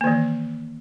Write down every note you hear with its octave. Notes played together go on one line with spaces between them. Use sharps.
D#3 E3 A#3